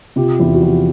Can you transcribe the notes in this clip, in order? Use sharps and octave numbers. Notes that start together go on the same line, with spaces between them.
C3 F4 G4
E2 E4
F4
F#4
F3 F4 G4